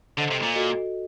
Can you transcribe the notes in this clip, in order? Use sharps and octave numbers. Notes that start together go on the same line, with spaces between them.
D3 A4 C5 D#5
C3
A#2
F#4 A4 D#5